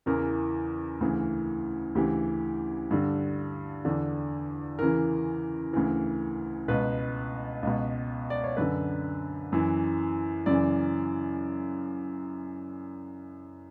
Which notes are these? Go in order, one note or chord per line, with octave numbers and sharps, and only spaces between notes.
E2 C#3 E3 A#4
D2 C#3 E3
D2 C#3 E3 G4
G2 D3
E2 D3
E2 C#3 E3 A#4
D2 C#3 E3
C#2 B2 B4
C#2 B2
D5
C#5
F#2 D3 B4
F#2 E3
F#2 C#3 E3 D5